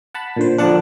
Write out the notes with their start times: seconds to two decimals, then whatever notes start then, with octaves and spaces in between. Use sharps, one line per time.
0.14 F#5 A5 B5
0.36 A#2 D3 C5
0.58 D3 F3 D4 A4 F#5 A5